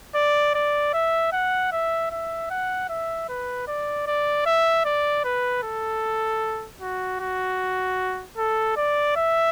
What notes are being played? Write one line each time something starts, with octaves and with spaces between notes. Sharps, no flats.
D5
D5
E5
F#5
E5
E5
F#5
E5
B4
D5
D5
E5
D5
B4
A4
F#4
F#4
A4
D5
E5